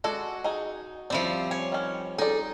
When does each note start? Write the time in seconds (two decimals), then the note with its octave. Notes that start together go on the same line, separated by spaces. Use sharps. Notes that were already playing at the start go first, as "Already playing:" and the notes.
0.04 G#3 F#4 A4 D5
0.44 D#4 G#4
1.10 F3 G3 C4 E4 D5
1.51 C#5 G#5
1.72 D#3 C#4
2.18 D#4 G#4 A4 D5